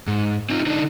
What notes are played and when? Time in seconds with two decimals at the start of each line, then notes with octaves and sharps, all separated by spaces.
0.07 G#2
0.50 C4 D#4 F4
0.66 D3 D4 D#4